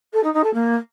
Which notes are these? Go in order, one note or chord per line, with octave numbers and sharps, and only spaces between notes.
A4
D#4
D#4
A4
A#3